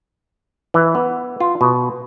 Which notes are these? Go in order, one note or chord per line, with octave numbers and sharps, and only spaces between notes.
E3
B3
F4
B2